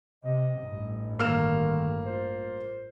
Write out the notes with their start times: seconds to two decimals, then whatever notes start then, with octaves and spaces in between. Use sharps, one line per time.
0.25 C3 D#5
0.60 A1 G2
1.19 D3 D#3 A#3 F6 E7
2.06 F4 C5